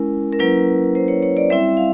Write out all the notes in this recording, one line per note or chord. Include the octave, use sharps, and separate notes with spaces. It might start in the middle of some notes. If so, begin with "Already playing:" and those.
Already playing: G#3 C#4 E4 A#4
A#4
F#3 A#3 C#4 E4 B4
C5
C#5
C#5
D5
G3 C4 E4 E5
F5